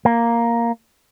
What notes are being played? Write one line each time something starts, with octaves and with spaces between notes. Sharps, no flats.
A#3